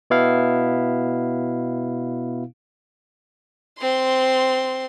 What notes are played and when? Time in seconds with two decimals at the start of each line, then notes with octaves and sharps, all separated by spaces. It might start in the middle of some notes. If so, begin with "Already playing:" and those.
0.10 B2 B3 E4 F5
3.80 C4 C6